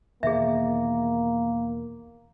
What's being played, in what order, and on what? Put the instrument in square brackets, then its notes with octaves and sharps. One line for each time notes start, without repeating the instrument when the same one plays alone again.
[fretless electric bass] E2 B2 D#3 [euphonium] A#3 [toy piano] G#4 E5